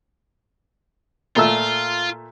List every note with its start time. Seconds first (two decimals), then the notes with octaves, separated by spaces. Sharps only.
1.36 A#2 A3 F4 E6